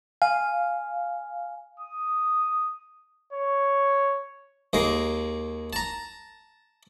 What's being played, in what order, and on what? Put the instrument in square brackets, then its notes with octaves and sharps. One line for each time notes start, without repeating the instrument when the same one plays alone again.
[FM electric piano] F5 [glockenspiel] G#5
[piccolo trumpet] D#6
C#5
[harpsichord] D#2 G#3 A#3
A5 A#5